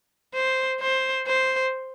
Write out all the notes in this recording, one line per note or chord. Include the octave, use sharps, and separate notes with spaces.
C5
C5
C5